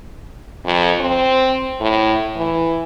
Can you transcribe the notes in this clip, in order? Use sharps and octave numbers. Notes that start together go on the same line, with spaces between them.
F2
C4
A2
E3